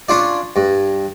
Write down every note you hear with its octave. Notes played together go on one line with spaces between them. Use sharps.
C#4 D4 F4 D5
G2